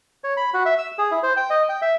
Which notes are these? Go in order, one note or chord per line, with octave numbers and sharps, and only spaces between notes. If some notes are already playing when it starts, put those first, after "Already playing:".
C#5
B5
F#4
E5
E6
G#4
E4
C5
G5
D#5
G5
E5